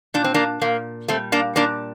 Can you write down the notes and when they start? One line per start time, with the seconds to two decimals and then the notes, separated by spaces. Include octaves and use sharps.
0.14 A#2 D4
0.24 C4
0.34 A#3 D4
0.61 A#2 A#3
1.08 G3 A3 C4
1.32 A#3 D4
1.56 A#2 A#3 D4